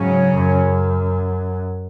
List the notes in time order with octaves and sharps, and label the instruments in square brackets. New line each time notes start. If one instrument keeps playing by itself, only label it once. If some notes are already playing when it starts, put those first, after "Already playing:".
Already playing: [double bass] G#2 [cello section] C#3 F#3 C#4
[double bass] F#2